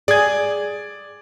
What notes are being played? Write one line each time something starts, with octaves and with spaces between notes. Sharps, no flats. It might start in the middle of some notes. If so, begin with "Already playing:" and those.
G#4 D5 G#6